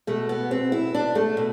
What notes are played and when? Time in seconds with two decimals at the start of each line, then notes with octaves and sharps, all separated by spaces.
0.07 B2 A3
0.29 B3
0.51 C4
0.72 E4
0.94 D4
1.15 A3
1.37 B2